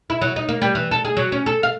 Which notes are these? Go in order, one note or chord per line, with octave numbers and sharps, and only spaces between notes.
E4
F#3
D#4
A#3
G3
E3
A4
G#4
F#3
C#4
A4
F5